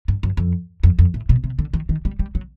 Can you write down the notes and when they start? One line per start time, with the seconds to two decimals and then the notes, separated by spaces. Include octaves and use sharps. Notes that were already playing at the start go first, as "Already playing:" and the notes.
0.08 G2
0.23 F#2
0.37 F2
0.83 F2
0.99 F2
1.14 A2
1.29 B2
1.44 C3
1.59 D3
1.74 D#3
1.89 D#3
2.05 G3
2.19 G3
2.35 F#3